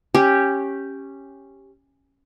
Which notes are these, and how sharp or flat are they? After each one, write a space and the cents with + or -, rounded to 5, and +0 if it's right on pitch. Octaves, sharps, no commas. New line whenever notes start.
C#4 -10 G4 +0